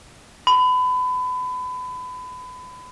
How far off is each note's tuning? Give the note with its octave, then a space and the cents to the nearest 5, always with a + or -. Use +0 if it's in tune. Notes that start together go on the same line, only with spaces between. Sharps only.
B5 +30